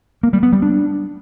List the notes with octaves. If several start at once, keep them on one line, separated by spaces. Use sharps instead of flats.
A#3
G3
B3
G3
D4